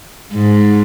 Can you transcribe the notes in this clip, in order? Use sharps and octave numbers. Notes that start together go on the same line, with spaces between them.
G#2